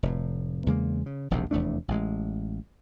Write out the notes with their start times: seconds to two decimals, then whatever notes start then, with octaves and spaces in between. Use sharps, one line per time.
0.03 F1 A2
0.66 E2 C#3 G#3 A#3
1.06 C#3
1.31 E1 A#1 D#2 C3
1.51 F1 E2 A3 D4
1.88 A1 G#3